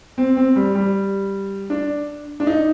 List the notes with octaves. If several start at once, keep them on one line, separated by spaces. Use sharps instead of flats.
C4
C4
G3
G3
D4
D4
D#4